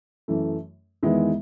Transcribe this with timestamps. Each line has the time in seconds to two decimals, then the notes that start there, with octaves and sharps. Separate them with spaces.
0.28 F#2 E3 A3
1.03 E2 D#3 G#3 B3 E4